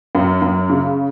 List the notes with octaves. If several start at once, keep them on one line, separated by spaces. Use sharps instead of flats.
F#2
F#2
C#3